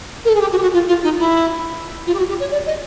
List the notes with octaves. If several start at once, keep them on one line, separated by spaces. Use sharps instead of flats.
A#4
A4
G#4
G4
F#4
G4
F#4
F4
F4
D#4
E4
F4
G4
F#4
G4
C#5
D5
D#5